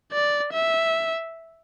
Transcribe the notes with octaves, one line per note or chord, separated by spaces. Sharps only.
D5
E5